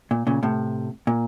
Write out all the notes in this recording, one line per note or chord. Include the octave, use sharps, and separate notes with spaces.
A#2
A#2 C#3
A2 C3
A#2